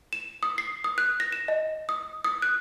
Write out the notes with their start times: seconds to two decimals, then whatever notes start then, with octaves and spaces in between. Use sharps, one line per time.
0.13 E7
0.43 D#6
0.58 C7
0.84 D#6
0.98 F#6
1.20 A#6
1.32 E7
1.48 D#5
1.89 D#6
2.24 D#6
2.42 F#6